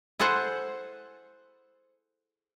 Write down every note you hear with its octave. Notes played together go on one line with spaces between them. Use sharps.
E4 G#4 A4 C5 F#5